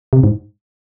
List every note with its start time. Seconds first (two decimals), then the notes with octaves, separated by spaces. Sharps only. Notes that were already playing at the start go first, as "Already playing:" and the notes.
0.13 C3
0.24 G#2